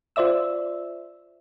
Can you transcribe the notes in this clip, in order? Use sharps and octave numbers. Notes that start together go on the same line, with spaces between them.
F4 C5 D5 E5 E6